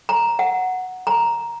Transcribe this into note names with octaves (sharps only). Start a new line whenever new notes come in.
A#5
F#5
A#5